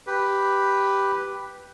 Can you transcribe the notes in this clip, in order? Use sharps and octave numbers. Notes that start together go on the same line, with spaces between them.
G4 B4